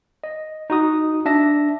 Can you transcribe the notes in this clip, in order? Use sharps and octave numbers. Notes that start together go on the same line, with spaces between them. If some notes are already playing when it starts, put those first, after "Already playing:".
D#5
D#4 F#4 D#6
D4 E5 A5 A#6